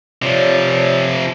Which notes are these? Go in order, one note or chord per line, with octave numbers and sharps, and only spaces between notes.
C3 F3 F4 C#5 D5